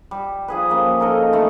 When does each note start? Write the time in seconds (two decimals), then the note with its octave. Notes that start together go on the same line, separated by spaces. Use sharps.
0.11 G3
0.48 F3 G#4 B4
0.70 F3 A#3 C#4
1.00 D#4 A4 A#4 D#5
1.33 E3 G#3 A3